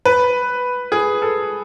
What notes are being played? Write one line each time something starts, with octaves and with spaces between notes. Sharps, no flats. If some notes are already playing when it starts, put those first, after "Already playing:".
B4
G#4
A4